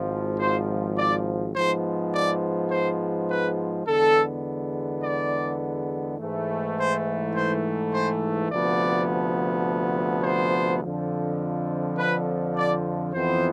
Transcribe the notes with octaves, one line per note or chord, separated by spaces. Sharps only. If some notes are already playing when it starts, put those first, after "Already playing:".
Already playing: G#1 G#2 F3
C5
D5
G#2 F3 G#3 B3 C5
D5
C5
B4
E2 D3 G#3 B3 A4
D5
G#2 E3 A3
C5
C5
C5
D2 C3 F3 B3 D5
C5
F2 D3 F3
B4
D5
F2 E3 B3 C5